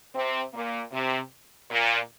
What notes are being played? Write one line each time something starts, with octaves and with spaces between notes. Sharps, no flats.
C3 C4
A#2 A#3
C3
A#2